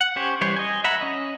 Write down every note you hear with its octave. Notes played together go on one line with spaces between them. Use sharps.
F#5
C#4 G4 C5 C#5
E3 G3 C5 C#5
D#5 G#5
E5 F#5 A#5 B5
C#4 D#5